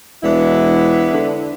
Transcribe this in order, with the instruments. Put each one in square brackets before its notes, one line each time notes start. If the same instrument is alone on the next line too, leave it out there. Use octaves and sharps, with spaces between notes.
[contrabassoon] E1 [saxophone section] B3 D4 E4
[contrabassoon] D3